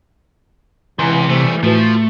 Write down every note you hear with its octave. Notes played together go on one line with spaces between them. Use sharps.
C#2 C3 E3 G#5 A#5 C6
G3 A3 C5
A2 F3 A3 F#4 B4